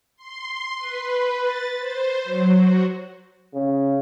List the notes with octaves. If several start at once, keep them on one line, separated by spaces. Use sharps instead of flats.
C6
B4
A6
C5
F#3
F#4
C#3